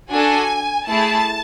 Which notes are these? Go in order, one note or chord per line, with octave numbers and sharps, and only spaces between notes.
D4 F#4 A4 G#5
A3 E4 G#4 A5